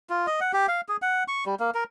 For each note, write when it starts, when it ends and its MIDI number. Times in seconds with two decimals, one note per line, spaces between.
0.10 0.26 65
0.27 0.40 75
0.41 0.52 78
0.53 0.67 67
0.68 0.81 77
0.89 0.97 68
1.02 1.24 78
1.28 1.44 85
1.46 1.55 55
1.60 1.71 58
1.74 1.84 70